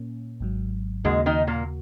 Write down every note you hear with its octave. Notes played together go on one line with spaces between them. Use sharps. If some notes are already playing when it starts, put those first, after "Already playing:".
Already playing: A#2 A#3 C#4
G#1 G#2 F#3
D#2 G#2 C#3 G#3 A#3 F#4
D#3 D#4
A#2 A#3